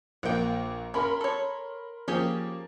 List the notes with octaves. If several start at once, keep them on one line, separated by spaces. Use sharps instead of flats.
A#1 A#3 F#5 G5
C#4 A#4 B5 C6
A4 C#5
F3 A#3 C#4 G4 G#4